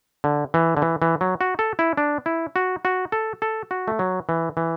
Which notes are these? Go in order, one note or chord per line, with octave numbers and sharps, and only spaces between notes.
D3
E3
D3
E3
E3
F#3
F#4
A4
E4
D4
E4
F#4
F#4
A4
A4
F#4
A3
F#3
E3
E3